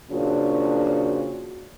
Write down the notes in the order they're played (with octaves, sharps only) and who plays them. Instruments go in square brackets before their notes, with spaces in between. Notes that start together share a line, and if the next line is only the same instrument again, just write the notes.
[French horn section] A#2 C#3 F3 D4 F#4